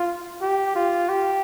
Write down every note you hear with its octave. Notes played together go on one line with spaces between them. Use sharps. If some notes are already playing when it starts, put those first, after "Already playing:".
Already playing: F4
G4
F4
G4